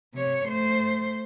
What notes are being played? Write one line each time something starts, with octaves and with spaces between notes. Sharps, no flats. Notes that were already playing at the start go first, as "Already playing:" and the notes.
C3 C#5
A3 C5